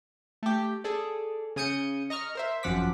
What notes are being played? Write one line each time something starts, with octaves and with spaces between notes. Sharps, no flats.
A3 G4
G#4 A4 D5
C#3 G#5 D#6 G6 C#7 D#7
D#5 A#5 C#6 F6
A#4 C5 E5
G#1 F#2 F3 F#5 D6 B6